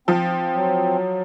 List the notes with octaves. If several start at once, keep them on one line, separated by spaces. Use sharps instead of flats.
F3 C4
F#3